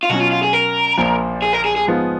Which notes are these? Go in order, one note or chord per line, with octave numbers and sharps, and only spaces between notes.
F4
B2 F#3 C#4 F#4
F4
F4
G#4
A#4
A#1 A#2 F3
G#4
A#4
G#4
G#4
G#2 F3 B3 F4 G#4